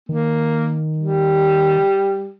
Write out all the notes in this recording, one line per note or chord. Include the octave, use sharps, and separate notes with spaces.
D#3 A#3
G3